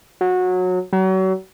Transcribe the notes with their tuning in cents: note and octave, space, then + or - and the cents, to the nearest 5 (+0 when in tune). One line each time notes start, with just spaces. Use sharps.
F#3 -20
F#3 +35